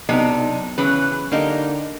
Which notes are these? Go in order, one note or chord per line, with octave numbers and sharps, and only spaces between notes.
B1 C3 D4 D#4
C#3 E3 F#3 B4
D3 A#3 D#4 G4